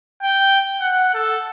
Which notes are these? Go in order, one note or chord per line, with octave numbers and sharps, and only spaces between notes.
G5
F#5
A4